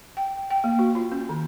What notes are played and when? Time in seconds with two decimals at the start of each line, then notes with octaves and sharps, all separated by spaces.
0.17 G5
0.50 G5
0.64 A#3
0.79 F#4
0.95 F4
1.12 C#4
1.29 D#3